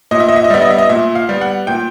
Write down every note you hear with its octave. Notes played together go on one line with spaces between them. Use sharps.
A#2 D#5
E5
D#5
E5
D#5
G3 B3 E5
D#5
E5
D#5
A#2 E5
F5
G3 B3
F#5
A#2 G5